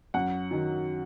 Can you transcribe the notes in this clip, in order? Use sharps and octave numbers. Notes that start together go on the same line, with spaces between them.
F#2 F#5
D#3 F#3